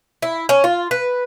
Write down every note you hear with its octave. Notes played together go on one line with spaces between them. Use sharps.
E4
C#4
F4
B4